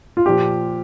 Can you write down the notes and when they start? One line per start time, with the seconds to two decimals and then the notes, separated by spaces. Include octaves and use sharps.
0.17 F4
0.26 A#2 F3 G4